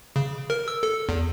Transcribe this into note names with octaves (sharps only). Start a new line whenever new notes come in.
C#3
A#4
E6
A4
E2